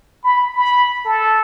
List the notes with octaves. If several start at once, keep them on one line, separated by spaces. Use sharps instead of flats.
B5
B5
A4